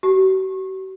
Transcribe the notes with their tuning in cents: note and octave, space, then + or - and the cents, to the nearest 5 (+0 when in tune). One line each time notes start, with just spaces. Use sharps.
F#4 +45